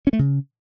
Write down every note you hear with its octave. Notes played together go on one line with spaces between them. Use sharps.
C#4
A3
C#3